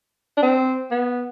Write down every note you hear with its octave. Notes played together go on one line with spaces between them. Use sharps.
D4
C4
B3